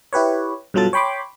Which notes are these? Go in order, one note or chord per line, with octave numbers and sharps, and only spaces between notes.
E4 G4 B4 C#5
G2 B2 F#3 F4 A4 A6
C#5 G5 B5 C6 D6